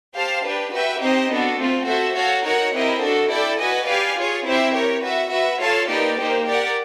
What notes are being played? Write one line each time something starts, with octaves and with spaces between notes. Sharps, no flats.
G4 C5 F5 A5
D4 G4 B4
F#4 B4 E5 G5
C4 D#4 G4 C5 D#5
B3 D4 F#4 A4
A3 C4 F4
F#4 A4 C5 E5
F#4 A4 C#5 F5
D#4 F#4 A#4 C#5 F#5
C4 E4 G4 A#4 D#5
D4 F#4 A4
E4 A4 D5 G5
F#4 B4 D#5 G#5
G4 B4 D5 F5 G#5
F4 G#4 C#5
C4 E4 G4 C5 E5
G4 A#4 C#5
F#4 B4 E5
F#4 B4 E5
F4 A4 C#5 F5 A5
A#3 D#4 G4 B4 D5
A#3 D#4 G4 C5
G4 A#4 D5 F#5